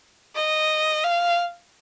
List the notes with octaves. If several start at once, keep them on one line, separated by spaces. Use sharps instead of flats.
D#5
F5